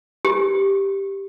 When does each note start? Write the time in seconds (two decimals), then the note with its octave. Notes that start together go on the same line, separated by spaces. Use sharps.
0.25 G4